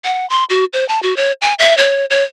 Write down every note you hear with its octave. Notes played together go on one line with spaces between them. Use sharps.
F#5
C6
F#4
C5
A5
F#4
C#5
G#5
E5
C#5
C#5